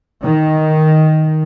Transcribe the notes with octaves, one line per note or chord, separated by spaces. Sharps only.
D#3